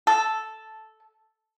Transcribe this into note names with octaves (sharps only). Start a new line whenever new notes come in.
A4